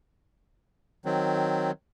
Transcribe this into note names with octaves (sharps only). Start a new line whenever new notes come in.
D#3 F#3 C4